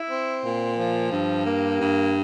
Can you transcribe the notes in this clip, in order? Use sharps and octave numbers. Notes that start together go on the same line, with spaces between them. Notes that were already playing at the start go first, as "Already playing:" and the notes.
Already playing: E4
C4
A#2
F3
G2
A#3
G2